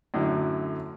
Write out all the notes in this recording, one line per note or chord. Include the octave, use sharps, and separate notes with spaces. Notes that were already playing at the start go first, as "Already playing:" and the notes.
F#2 A2 D3 F#3